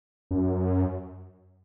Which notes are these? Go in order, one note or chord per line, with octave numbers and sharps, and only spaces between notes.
F#2